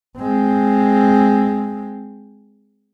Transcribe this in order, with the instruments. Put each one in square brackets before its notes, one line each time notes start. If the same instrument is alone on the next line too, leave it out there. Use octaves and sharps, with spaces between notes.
[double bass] G#3 C4